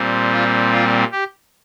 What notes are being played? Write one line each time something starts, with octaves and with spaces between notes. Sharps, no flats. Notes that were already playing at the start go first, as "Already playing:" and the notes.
Already playing: A#2 G3 C4
F4
F4
G4